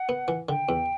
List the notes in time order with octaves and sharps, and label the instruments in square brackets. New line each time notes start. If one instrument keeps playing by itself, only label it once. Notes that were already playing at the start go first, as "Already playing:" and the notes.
Already playing: [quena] F#5
[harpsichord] B3
E3
[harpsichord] D3 [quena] G5
[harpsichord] E2